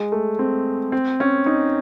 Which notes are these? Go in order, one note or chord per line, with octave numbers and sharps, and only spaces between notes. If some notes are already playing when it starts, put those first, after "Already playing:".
Already playing: G#3
A3
C4
C4
C#4
D#4